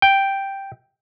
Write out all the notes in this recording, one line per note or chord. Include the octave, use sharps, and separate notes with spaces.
G5